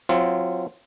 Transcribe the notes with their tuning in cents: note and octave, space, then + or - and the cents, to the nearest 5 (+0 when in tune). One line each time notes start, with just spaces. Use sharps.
F#3 -20 C4 +0 F4 -25